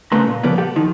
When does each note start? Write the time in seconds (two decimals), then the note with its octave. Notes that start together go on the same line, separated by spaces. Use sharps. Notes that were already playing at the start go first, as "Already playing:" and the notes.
0.12 C2 C#3 A3 B4 A#5 C6
0.27 A#2
0.43 C#3 F3 G3 A#3 B3
0.58 G4 A4 F#5
0.76 D#3 F3